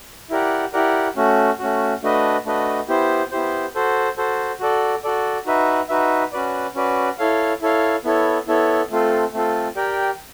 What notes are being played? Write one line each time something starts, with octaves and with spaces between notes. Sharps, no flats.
E4 G4 A#4 D5 F#5
E4 G4 A#4 D5 F#5
A3 C#4 F#4
A3 C#4 F#4
A3 D4 F#4 B4 D#5
A3 D4 F#4 B4 D#5
B3 E4 G4 C5
B3 E4 G4 C5
F#4 A4 C5
F#4 A4 C5
F#4 A4 D5
F#4 A4 D5
D#4 F#4 B4 E5
D#4 F#4 B4 E5
C#4 F#4 B4 D5
C#4 F#4 B4 D5
E4 A4 C#5 F5
E4 A4 C#5 F5
B3 E4 A4 C#5
B3 E4 A4 C#5
A3 C4 F4 A4
A3 C4 F4 A4
G4 A#4 D5 G5